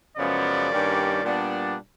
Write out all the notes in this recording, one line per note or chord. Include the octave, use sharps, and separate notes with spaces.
F#2 C#3 F3 G#3 B3 D5
G2 D#3 G3 A#3 C#4
A#2 G3 B3 D4